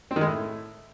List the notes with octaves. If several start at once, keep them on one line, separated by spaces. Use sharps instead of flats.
C4
D#3
G#3
A2